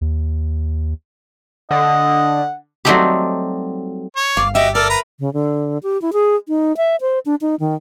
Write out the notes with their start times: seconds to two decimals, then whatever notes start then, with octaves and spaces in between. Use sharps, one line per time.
0.01 D#2
1.71 D3 D#5 F#5
2.85 F#3 G3 A3 C4 D#4 G4
4.16 C#5
4.37 G1 F5 D6
4.55 F#4 G4 D#5 E5
4.75 A4 A#4 D5 F6
4.90 B4 A#5 B5
5.20 C#3
5.34 D3
5.83 G4
6.02 E4
6.13 G#4
6.48 D#4
6.77 E5
7.01 C5
7.26 D4
7.41 D#4
7.60 D#3